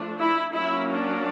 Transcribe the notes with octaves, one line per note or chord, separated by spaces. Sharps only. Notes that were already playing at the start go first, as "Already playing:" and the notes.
Already playing: F3 A3 D4
E4
F#3 A#3 C#4 E4
D4